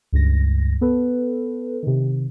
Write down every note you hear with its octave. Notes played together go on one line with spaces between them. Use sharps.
C#2 G2 A#6
B3 A4 B4
C3 D#3